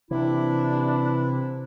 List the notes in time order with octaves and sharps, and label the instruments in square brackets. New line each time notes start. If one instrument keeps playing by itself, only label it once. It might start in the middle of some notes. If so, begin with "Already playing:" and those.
[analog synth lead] C3 [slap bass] E3 [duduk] D4 [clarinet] E4